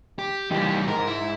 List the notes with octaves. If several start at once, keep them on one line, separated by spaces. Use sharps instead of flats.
G4
E3 G3 D#4 G4
G#2 A#4
E4